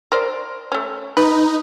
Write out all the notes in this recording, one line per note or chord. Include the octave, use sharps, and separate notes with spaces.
A#4 C5 D5
A3 C#4
D#4 B4